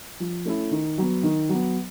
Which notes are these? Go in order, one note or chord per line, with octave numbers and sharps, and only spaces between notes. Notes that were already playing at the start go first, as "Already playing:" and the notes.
F3
A3 C#4 E4
D#3
F#3 B3
D#3
F#3 B3